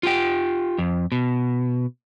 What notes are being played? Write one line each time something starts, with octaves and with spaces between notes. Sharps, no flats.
F4 G4 G5
F2
B2